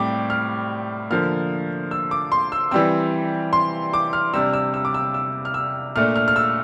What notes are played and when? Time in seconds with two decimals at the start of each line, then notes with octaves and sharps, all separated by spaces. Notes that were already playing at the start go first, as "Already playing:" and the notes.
Already playing: A2 G3 C4 D6
0.30 F6
1.10 D3 F3 A#3 F6
1.91 E6
2.11 D6
2.32 C6
2.52 E6
2.71 E3 G3 C4 E6
3.53 C6
3.93 D6
4.13 F6
4.34 C3 G3 D4 E6
4.53 E6
4.74 E6
4.85 D6
4.94 E6
5.14 E6
5.45 F6
5.54 E6
5.96 A#2 A3 D4 F6
6.16 F6
6.28 F6
6.36 E6